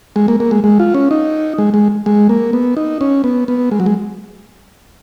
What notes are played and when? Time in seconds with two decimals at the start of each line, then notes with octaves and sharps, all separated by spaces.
0.16 G#3
0.28 A#3
0.40 A#3
0.51 G#3
0.64 G#3
0.79 F4
0.94 C#4
1.11 D#4
1.58 G#3
1.74 G#3
2.06 G#3
2.29 A#3
2.53 B3
2.77 D#4
3.01 C#4
3.24 B3
3.48 B3
3.72 G#3
3.80 F#3
3.86 G#3